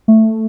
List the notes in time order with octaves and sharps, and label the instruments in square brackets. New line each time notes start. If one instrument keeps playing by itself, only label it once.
[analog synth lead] A3